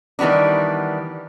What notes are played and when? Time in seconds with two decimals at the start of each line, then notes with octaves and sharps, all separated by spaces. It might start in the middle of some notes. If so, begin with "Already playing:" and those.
0.19 D#3 E3 G3 B3 D4